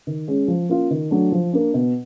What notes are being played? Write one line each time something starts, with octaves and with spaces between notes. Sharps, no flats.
D#3
G#3 C#4
F3
A#3 C#4 F4
D#3
F#3 A3 D4
F3
A#3 D4
B2